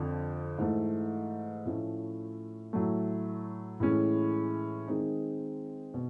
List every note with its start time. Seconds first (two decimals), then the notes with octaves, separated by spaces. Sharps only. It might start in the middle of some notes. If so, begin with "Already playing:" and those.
Already playing: F2 D3 F3
0.58 G#2 E3 A3
1.66 A2 F3 A3 C#4
2.73 A2 F#3 A3
3.80 A2 E3 G#3 C#4
4.88 D#3 G#3 C4 D#4
5.94 B2